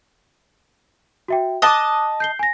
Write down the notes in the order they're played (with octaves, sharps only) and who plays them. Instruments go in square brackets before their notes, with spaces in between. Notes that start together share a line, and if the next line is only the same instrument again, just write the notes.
[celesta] F#4 E5 G5
[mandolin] D#5 A5 [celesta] D6 D#6 F#6
[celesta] G6 C7 G7
G#5 A#6